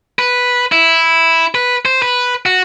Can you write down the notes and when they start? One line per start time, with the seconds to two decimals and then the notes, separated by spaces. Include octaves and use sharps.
0.19 B4
0.72 E4
1.55 B4
1.85 C5
2.02 B4
2.46 F#4